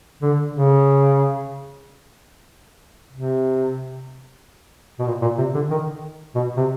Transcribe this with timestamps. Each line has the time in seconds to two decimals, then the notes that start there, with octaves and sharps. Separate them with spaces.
0.22 D3
0.54 C#3
3.13 C3
4.99 B2
5.07 A#2
5.22 A#2
5.38 C3
5.55 D3
5.71 D#3
6.35 B2
6.57 C3